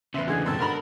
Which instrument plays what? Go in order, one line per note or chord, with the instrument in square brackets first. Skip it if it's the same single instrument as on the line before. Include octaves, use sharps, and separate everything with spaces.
[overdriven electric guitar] E2 C#3 [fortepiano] B4 E5 [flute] C6
[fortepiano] D3 E3 [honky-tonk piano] G#3 B3 [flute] G#4
[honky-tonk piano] G#2 B2 D#3 [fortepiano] A4 E6 [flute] A5
[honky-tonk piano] G#2 B5 F#7 [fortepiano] D3 F#3 B3 [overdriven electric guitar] A#4 A#5